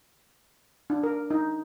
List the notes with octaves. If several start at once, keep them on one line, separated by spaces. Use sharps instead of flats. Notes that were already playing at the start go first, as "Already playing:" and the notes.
D4
A#4
D#4